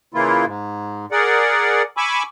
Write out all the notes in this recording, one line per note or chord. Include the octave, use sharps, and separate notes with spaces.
C#3 E3 A#3 E4 F4
G#2
G#4 A#4 D5 F#5
G#5 B5 C#6 D6 E6